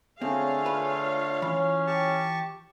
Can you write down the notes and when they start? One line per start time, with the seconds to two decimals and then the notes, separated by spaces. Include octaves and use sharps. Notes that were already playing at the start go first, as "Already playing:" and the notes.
0.22 D3 A3 C4 F4 G#4 C#5 F5
0.66 B4
1.42 E3 C#4 B5
1.87 G4 A5 C#6